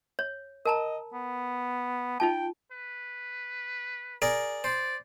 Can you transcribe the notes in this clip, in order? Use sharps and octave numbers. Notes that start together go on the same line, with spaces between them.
C#5
A#4 D#5 A5 A#5
B3
D#4 F4 G5 A5
B4
G#4 A#4 D5
C5 D5